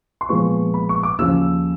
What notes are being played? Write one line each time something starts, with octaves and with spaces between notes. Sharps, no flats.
C6
A#2 F3 G#3 B3 C#6
B5
C#6
D6
D#2 C#3 F3 E6